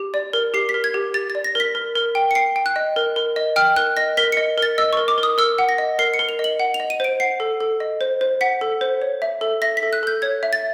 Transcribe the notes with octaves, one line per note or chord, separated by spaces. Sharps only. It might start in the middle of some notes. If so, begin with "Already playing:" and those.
Already playing: G4
D5
A#4
G4 C7
B6
A#4
G#6
G4
G4 A6
A6
D5
A#6
A#4 B6
A#4
A#4
G5
C#7
G5 C7
G5
F#6
D#5
A#4
A#4
D#5
G5 F6
A#4 F#6
D#5 A#6
A#4 B6
C#7
D#5
A#4 A6
D#5 E6
C#6
A#4
D6
A#4
D#6
A#4 E6
F#5
A#6
D#5
A#4 C7
C#7
A#4
F7
D#5
F#7
F#5
F7
D#5
D#7
C5 D7
F#5 C7
A4
A4
D#5
C5
C5
F#5 B6
A4
C5
C#5
E5
A4
E5 A#6
B6
A4
F#6
A4 G6
C#5 G#6
E5
A6